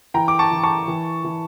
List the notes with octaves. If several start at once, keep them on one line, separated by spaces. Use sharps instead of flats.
E3 G5 A#5
D6
A5 C#6
E3
A5 C#6
E3
E3